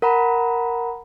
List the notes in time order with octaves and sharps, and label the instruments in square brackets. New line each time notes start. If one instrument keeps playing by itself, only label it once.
[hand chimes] A#4 F#5 A#5 B5